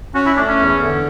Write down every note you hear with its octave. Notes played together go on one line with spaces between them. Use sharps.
C#4 F#4
E4
A3 D4
C#4
E2
D3